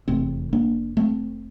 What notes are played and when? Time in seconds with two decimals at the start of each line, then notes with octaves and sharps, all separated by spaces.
0.08 F1 E2 C3 A3 C4
0.53 A#3 D4
0.97 A3 C4